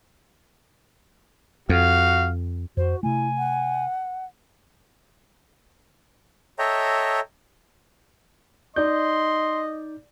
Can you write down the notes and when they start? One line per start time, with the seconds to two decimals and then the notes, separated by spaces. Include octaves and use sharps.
1.69 F2 F#4 F5
2.77 F2 F#4 C5
3.03 C3 A3 E4 G#5
3.38 F#5
6.59 A4 C#5 D#5 E5 G5 A#5
8.76 D#4 D5 D#5 C6 G6